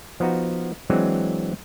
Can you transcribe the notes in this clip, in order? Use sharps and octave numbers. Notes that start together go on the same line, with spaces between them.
F3 B3 D#4 F#4
E3 F#3 G#3 C4 D4